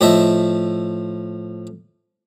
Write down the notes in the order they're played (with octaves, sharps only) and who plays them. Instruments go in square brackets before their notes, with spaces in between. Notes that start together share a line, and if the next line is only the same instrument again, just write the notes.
[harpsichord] A2 F3 D#5 E5 A5